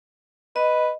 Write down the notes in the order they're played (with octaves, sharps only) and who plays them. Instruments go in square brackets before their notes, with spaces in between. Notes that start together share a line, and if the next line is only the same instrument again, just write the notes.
[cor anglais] B4 [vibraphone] D#5